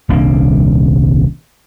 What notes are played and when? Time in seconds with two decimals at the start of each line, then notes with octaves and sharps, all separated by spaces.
0.09 D#1 C2 A#3 D4